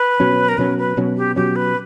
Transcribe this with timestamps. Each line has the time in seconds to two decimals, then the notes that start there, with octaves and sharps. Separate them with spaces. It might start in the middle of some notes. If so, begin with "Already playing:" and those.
Already playing: B4
0.20 B2 F#3 C#4
0.49 A#4
0.58 B2 F#3 C#4 B4
0.78 B4
0.97 B2 F#3 C#4
1.17 G4
1.36 B2 F#3 C#4 G4
1.56 B4